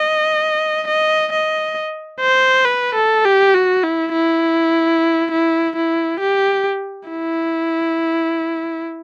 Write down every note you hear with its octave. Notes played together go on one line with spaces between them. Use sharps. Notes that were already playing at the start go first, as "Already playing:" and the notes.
Already playing: D#5
D#5
D#5
C5
B4
A4
G4
F#4
E4
E4
E4
E4
G4
E4